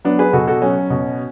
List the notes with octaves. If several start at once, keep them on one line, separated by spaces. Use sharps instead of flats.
F#3 B3 D4
G#4 B4
B2 F#4 A4
F#4 A4
F#3 C#4
B2